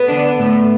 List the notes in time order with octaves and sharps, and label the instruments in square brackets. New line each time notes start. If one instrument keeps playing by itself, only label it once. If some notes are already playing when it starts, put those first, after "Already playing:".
Already playing: [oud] B3
[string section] D3 D4
A2 A3